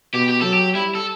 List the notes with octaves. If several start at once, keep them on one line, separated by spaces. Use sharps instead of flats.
B2 G4
G4
F#3 A4
G4
G3 E4
A4